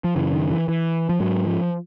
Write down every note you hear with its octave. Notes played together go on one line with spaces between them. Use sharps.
F3
F#2 C#3 E3
D#3
E3
E3
F3
G#2 F#3
F3